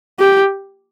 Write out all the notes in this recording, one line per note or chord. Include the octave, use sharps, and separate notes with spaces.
G4